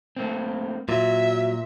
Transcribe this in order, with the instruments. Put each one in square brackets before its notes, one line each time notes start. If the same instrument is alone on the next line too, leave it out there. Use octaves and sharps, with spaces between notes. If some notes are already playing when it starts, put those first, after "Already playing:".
[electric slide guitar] A3 A#3 C4
[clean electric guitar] A#2 [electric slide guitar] F#3 [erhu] E5